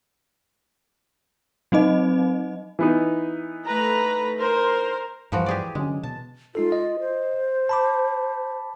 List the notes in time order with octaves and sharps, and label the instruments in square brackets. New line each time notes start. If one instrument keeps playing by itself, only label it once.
[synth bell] F#3 C4 D#4 D#5
[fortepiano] E3 B3 D#4
[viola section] A3 B4 A#5
A#4 C5
[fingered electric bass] G2 [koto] E3 F3 F#4
[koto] G4 G#4 D5
[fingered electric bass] D3 F#3 C#4 [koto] G#3
[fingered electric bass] B2 [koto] A5
[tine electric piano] G#3 D#4 A4 [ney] F4
[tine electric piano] D#5
[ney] C5
[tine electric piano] A5 B5 D6